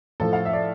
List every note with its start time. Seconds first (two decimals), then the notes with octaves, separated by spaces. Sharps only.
0.20 A2 F3 A4
0.33 F5
0.45 E5
0.53 D5